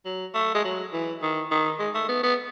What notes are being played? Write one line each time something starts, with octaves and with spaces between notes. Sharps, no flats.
F#3
A3
G#3
F#3
E3
D#3
D#3
G#3
A3
B3
B3